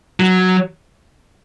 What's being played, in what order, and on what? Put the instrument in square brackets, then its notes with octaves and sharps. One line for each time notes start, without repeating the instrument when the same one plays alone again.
[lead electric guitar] F#3